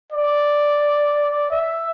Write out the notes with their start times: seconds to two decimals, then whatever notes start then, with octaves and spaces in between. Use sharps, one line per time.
0.12 D5
1.50 E5